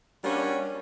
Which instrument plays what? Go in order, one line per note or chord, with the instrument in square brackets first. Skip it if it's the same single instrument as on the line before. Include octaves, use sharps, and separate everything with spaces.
[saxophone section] G3 A#3 C#4 D4 F#4